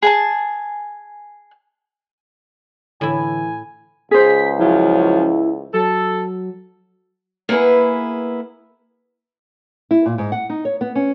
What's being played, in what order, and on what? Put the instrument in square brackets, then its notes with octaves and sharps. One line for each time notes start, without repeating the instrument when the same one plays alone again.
[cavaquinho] G#4 G#5 A5
[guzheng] A2 E4 [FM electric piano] D3 [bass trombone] E3 [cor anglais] G#5
[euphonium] C#2 [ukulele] G#4 C5 [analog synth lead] B6
[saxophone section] F3 F#3 C#4 [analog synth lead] E4
[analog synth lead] F#3 [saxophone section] A4
[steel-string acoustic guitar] A#3 B3 E4 G#4 B4
[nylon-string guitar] E4
A#2
G#2
F#5
D#4
C#5
B3
C#4